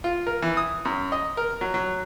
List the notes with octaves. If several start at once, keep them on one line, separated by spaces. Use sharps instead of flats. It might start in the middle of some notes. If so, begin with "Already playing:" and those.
F4
A#4
E3
D#6
F#2
D#5
A#4
F#3
F#3